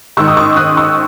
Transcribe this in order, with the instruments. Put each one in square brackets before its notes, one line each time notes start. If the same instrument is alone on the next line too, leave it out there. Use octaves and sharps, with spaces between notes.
[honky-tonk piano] G#2 D#3 C#6 E6
D#6
C#6 E6
D#6 F#6
C#6 E6